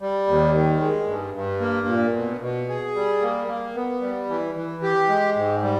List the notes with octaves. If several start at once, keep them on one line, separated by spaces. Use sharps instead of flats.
G3
D#2
D#3
G#3
G2
G2
A#3
A#2
B2
B2
G#4
G3
A#3
A#3
B3
G3
E3
E3
G4
G#3
G#2
G3